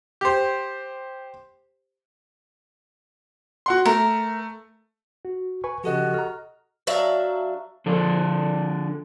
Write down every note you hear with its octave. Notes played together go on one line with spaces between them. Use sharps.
G4 C5
F#4 F#5 C6
A3 A#4
F#4
B4 G#5 C#6
C#3 F3 F#4 G4 A4 D#5
A4 A#5 F6
F#3 D4 E5 F5
D3 F3 D4 A4